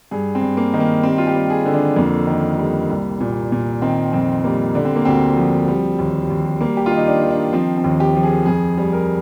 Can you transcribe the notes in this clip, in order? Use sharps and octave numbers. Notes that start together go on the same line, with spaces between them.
G2 G#4
C4
G2
A#3
D#3
A#3
G3 C4
F4
G4
G3
G#4
D3
D4
F2 A#3
D#3
G3
C2
A#2
A#2
D#3 C4
F2 C4
G3 A#3
D3 D4
C4
A#3
D2 C4
F3
G3
D#2
D#2
G3 A#3
G4
F4
D#3
D#4
D4
D#3
D4
F3 C4
C4
D#2
G4
F3
G#4
F2 G#4
G3
A#4